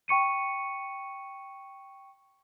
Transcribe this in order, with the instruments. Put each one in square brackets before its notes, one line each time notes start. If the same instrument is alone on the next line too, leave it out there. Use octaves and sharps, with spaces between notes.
[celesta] G5 C#6 C#7 D#7